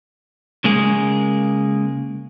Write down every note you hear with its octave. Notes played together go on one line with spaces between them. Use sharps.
C#3 G#3 A#3 G#4